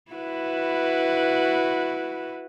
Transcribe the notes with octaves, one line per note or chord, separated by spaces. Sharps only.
E4 F#4 B4